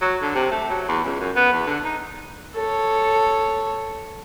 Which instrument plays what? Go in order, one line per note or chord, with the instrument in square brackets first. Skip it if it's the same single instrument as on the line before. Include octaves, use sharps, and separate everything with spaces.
[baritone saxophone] F#3
D3
C3
A3
F#3
E2
C#2
F#2
B3
E2
D3
D#4
[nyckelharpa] A4 C#5